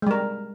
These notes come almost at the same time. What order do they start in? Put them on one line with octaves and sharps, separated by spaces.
G#3 G3 A#4